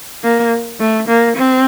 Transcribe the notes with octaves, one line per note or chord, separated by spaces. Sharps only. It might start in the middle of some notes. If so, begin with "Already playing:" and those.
A#3
A3
A#3
C4